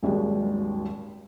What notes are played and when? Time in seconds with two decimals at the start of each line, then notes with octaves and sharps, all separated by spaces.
0.03 D#1 G#1 D#2 F#3 G#3